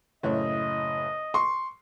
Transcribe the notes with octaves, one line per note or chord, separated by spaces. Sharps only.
F#1 A2 C#5 D#5
C6 C#6